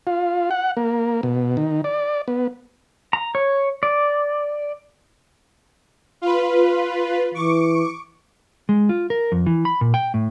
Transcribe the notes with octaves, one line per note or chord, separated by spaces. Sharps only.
F4
F#5
A#3
B2
D#3
D5
B3
A#5
C#5
D5
F4 B4
E3 C#6 D6
G#3
F4
A#4
F2
E3
B5
A#2
G5
A2